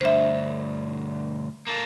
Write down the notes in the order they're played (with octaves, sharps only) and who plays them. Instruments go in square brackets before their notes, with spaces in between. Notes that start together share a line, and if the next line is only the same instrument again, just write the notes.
[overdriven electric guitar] D2 G2 [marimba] C5 E5
[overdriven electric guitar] A#3 A4